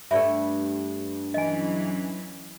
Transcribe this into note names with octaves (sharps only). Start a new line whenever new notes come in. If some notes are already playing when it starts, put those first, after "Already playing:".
G2 A3 D5 E5
E3 F#3 C#4 D#5 G#5